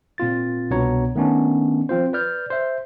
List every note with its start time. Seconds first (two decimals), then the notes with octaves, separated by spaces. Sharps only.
0.18 A#2 C4 F4 A6
0.70 C2 B2 B3 D4 C#5 A#5
1.15 D#3 A3 B3 C#4 D4
1.89 F3 C4 F4 C5
2.13 B4 D5 F6 G6
2.50 C5 E5